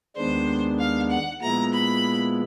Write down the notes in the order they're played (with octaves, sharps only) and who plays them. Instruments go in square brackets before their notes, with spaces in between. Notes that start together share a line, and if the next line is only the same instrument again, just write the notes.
[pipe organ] D#2 D#3 G#3 B3 D4 [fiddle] C5
[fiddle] F5
F#5
[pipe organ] A#2 F3 G#3 B3 E4 [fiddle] A#5
[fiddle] B5